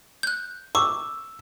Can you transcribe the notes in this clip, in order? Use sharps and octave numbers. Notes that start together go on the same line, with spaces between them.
F#6 G6
C#6 D6 E6